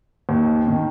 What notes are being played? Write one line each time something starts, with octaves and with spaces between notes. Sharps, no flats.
D#2
D#3